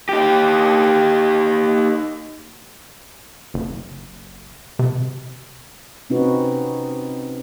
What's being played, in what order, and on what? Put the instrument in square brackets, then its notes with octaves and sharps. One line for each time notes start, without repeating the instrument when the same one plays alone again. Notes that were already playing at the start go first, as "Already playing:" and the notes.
[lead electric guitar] D#4 G4
[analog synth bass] F#1
C3
[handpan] C3 C4 C#4 D#4 F#4 B4